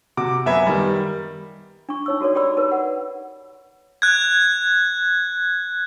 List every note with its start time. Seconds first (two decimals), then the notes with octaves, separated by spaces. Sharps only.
0.17 C3 F#4 D6
0.46 F#2 B3 E5 G#6
0.67 D#3 G3
1.89 D4 C#6
2.06 D#4 C#5 E6
2.21 F#4 A4 A#4 C#5 D5
2.35 G4 A#4 C#5 D5 B5 E6
2.57 D#4 A#4 B4
2.72 F#5
4.02 F#6 G#6